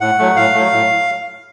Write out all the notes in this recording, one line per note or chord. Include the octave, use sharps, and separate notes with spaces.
A2 F#5
F#3 A3
A2 F5
F#3 A3
A2